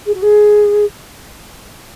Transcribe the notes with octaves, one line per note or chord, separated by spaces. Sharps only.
G#4
F#4
G#4